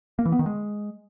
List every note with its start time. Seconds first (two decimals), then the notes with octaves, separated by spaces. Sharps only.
0.19 A#3
0.25 E3
0.32 B3
0.39 D#3
0.46 G#3